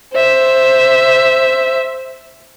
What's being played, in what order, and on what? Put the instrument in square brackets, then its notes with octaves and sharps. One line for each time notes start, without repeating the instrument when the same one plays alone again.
[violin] C5 E5